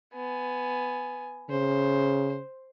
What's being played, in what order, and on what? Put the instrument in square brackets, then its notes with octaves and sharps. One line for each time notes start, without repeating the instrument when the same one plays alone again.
[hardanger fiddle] B3 G#5
[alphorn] C#3 [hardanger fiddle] C5